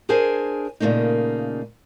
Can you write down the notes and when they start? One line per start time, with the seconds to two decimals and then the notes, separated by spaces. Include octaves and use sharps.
0.09 D4 G#4 A#4 C5 G#5
0.80 A#2 C#3 A3 A#3 D#4